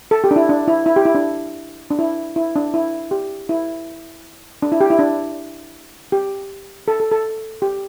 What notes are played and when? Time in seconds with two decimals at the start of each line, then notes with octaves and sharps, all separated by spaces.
0.11 A4
0.24 G4
0.31 D4
0.36 E4
0.49 D4
0.68 E4
0.86 E4
0.96 G4
1.05 E4
1.15 D4
1.90 D4
1.99 E4
2.36 E4
2.56 D4
2.74 E4
3.11 G4
3.49 E4
4.62 D4
4.72 E4
4.81 G4
4.90 E4
4.99 D4
6.12 G4
6.88 A4
7.00 A4
7.12 A4
7.62 G4